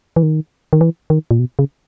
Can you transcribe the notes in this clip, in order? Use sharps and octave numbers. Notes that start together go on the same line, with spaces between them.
E3
D#3
D#3
E3
D#3
A#2
B2
C#3